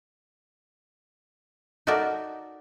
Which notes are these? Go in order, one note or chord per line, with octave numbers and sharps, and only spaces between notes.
D#4 F#4 A4 A#4 D5 E5